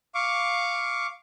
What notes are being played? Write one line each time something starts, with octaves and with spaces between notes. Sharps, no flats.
F5 C#6 D6